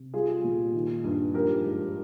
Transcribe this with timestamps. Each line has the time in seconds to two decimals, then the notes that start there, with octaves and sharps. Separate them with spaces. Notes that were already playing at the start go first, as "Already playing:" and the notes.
Already playing: C3
0.13 G3 F4 G#4
0.44 A#2
0.74 D#3
1.04 G2
1.34 F3 G4 A#4
1.64 G#2